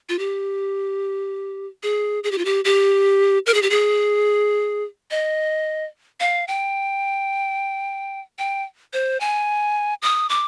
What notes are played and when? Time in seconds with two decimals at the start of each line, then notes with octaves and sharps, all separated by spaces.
0.09 F4
0.19 G4
1.83 G#4
2.24 G#4
2.32 G4
2.38 F4
2.45 G4
2.65 G4
3.46 A#4
3.54 G#4
3.62 G4
3.70 G#4
5.11 D#5
6.20 F5
6.48 G5
8.39 G5
8.93 C5
9.20 G#5
10.02 D#6
10.30 D6